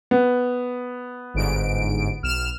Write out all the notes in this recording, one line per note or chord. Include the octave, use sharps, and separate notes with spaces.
B3
G1 G#2 D7
B1 F6 E7